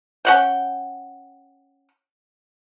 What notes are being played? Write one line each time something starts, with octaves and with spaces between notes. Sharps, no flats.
C#4 F#5 G5